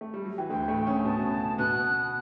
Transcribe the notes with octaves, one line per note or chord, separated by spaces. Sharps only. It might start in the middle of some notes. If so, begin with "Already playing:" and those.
A3
G3
F#3
E3
D2 D3 G5
A2 A3
C#3 C#4
B2 B3 A5
B2 B3 F#6